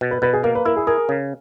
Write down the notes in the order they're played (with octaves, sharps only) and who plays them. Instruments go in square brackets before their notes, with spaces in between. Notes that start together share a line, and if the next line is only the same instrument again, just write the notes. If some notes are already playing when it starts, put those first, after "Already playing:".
[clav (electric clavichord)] B2
[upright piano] B4
[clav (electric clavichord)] B2 [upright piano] B4
[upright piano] G#4
[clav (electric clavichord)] A#3 [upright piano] A#4
[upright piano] B4
[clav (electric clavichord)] E4 [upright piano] A#4
[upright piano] G#4
[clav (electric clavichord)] G#4 [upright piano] A#4
[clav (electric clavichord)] C#3